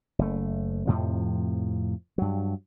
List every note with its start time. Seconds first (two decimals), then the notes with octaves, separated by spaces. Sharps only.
0.19 F#1 A3
0.87 F2 A2 C3 F3
2.18 G2 F#3